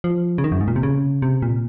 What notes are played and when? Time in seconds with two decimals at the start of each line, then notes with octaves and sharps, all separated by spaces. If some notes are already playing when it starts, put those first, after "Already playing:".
0.04 F3
0.38 C#3
0.44 D#3
0.52 F#2
0.61 G#2
0.68 A#2
0.76 C3
0.83 C#3
1.22 C3
1.42 A#2